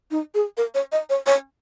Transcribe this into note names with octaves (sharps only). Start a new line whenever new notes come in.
D#4
G#4
A#4
C#5
D#5
C#5
C#5